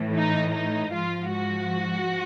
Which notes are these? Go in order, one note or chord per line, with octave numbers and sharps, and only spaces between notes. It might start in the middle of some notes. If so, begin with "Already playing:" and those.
Already playing: A2 E3
D#4
D#4
G#2 F3 F4
F#4